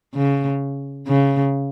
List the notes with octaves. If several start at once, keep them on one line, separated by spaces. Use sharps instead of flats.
C#3
C#3